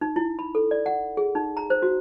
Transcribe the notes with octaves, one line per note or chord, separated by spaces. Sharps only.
D#4
E4
B5
A4
D5
F#5
G#4
D#4
A#5
C5
F#4